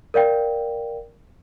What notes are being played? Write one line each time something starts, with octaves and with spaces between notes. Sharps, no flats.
A#4 D5 F5 G5